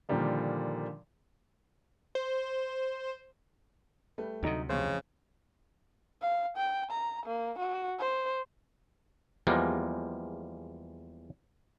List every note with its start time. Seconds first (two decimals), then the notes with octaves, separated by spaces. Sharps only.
0.09 A#2 D3 D#3 F3 G3 A#3
2.15 C5
4.18 G3 A3 B4
4.43 D2 C3 F#3 D#4
4.69 A1 F2 C#3 C5 C#6
6.22 F5
6.57 G5
6.91 A#5
7.26 A#3
7.59 F#4
8.00 C5
9.47 E2 F3 G3 G#3 A#3